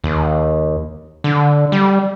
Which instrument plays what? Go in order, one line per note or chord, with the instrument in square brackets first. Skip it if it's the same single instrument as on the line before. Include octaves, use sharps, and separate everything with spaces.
[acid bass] D#2
D3
G3